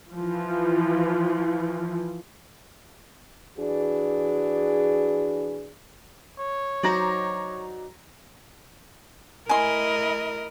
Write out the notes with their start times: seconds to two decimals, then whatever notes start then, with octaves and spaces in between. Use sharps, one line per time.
0.13 E3 F3
3.58 E3 D4 F#4 G#4
6.40 C#5
6.83 F#3 D#4 C5 D5 A#5 A#6
9.49 A3 E4 A#4 D#5 G#5 C6